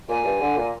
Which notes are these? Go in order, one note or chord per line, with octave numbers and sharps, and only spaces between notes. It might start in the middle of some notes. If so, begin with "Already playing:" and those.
A#2 G#5
G2
D3
A#2